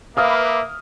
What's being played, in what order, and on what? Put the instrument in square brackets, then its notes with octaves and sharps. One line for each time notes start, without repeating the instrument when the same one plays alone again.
[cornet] A#3 [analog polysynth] B4 D6 [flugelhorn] E5 [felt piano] F5 D#6 F6